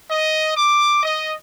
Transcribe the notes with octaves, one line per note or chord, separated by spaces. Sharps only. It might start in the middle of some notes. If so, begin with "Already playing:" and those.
D#5
D6
D#5